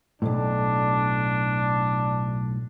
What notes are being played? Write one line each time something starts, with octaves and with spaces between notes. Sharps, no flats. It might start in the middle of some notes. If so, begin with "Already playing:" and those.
B1 F2 A2 D4